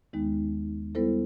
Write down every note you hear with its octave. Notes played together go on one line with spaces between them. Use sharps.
D#2 D#3 G#3 B3 D#4
G3 B3 E4 A4 C5